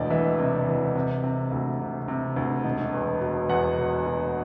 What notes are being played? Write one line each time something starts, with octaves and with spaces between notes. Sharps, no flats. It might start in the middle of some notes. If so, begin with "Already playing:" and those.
Already playing: E1 D2 E3 D5 D#5
E3 E5
C3
E3
C3
C3
D2
C3
C3
D2
E1
E2
B2
E2 F#5
B2
B2